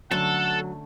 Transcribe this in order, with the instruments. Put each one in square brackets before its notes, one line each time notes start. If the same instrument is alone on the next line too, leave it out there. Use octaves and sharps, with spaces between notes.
[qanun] D3 A3 C#4 [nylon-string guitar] F#3 [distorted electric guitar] A4 [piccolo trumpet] F#5